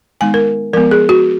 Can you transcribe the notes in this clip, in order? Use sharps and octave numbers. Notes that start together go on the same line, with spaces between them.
D#3 G#3 B3 D#4 G#5
A#4
F3 G#3 B3 A#4
G#4
F#4